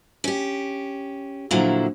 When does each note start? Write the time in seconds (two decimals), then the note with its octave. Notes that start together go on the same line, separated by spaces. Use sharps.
0.24 C#4 G4
1.51 A#2 D3 F3 F#3 E4